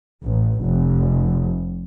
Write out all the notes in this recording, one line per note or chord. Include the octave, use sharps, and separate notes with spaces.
A1
F1